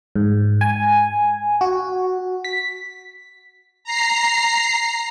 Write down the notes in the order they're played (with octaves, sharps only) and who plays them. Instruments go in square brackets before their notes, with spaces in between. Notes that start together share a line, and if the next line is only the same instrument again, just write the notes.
[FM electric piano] G#2
G#5
F#4
B6
[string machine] A#5 C7